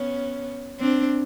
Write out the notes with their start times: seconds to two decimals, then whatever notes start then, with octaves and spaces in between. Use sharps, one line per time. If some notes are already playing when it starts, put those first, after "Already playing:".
Already playing: B3 C#4
0.79 C4 D4